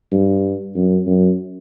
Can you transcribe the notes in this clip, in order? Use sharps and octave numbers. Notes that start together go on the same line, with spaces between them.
G2
F#2
F#2